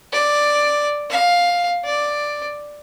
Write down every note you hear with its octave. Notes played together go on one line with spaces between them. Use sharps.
D5
F5
D5